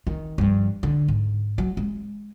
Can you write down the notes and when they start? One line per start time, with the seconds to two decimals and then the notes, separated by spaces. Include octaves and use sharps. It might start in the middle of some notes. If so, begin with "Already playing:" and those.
0.07 D#3
0.38 G2 F3
0.83 D3
1.08 G#2
1.58 F#3
1.77 G#3